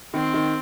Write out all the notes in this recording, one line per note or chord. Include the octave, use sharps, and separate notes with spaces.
D#3 C4
D#3